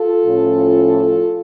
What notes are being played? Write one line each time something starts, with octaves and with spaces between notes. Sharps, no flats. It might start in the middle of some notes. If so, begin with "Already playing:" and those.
Already playing: F4 A4
A2 F3 C#4